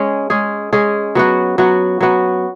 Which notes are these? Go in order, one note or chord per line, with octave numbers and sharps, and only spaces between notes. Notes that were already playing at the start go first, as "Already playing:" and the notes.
Already playing: G#3 C#4 G#4
G#3 C#4 G#4
G#3 C#4 G#4
F#3 B3 F#4
F#3 B3 F#4
F#3 B3 F#4